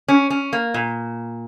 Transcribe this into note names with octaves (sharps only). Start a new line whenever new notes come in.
C#4
C#4
A#3
A#2